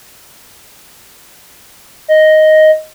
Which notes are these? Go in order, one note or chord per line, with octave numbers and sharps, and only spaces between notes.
D#5